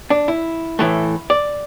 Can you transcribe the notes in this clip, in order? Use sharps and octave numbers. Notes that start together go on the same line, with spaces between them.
D4
E4
A2 E3 A3
D5